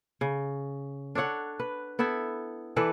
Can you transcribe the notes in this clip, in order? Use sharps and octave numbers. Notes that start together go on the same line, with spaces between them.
C#3
D4 A4 C#5 F#5
B4
B3 E4 A4 E5
E3 A4 B4 D5